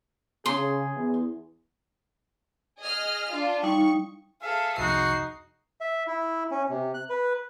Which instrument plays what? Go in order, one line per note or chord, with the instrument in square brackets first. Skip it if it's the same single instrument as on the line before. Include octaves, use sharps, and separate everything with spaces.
[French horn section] C#3 [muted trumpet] G#4 [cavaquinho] C6
[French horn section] E2
[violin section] G#4 D#5 F6
D4 F4
[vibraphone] G3 D#4 [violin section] C#6
[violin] G#4 A4 [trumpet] E5 [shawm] F5
[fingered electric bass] C2 F2 C3 [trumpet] D#4 [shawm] F#4 [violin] C7
[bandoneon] E5
E4
C#4
C3
F#6
B4